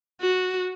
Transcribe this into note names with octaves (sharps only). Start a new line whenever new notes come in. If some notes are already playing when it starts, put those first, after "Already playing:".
F#4